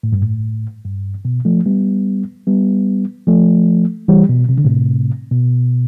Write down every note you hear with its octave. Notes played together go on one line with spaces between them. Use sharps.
A2
G2
A2
G2
B2
F3 A3
G3 B3
G3 B3
F3 A3
E3 G3
B2
C3
D3
A2 C3
B2